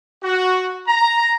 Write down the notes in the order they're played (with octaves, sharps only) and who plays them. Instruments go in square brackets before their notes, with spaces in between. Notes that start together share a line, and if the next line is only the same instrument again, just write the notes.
[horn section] F#4
A#5